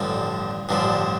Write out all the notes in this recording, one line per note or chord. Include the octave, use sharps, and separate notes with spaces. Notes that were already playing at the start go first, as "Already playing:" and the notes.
Already playing: A1 G2 D3 F3 D#4
A1 G2 D3 F3